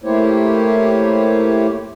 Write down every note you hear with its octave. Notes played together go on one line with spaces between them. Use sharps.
A3 A#3 E4 G4 C5 C#5